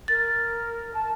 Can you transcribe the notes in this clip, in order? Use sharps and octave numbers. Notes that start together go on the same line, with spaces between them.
A#4 A6
A5